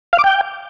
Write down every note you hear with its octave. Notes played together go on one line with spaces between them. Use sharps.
F5
D6
G5